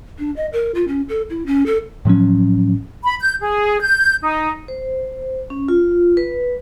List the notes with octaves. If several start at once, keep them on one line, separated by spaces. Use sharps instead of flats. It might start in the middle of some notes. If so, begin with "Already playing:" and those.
D4
D#5
A#4
F4
C#4
A4
E4
C#4
A4
A2 F3 F#3 C#4
B5
G6
G#4
G6
D#4
C5
C#4
F4
B4